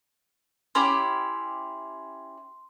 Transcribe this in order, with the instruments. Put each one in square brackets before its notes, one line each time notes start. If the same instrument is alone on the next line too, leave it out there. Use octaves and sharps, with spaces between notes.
[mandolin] C#4 E4 G4 [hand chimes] C6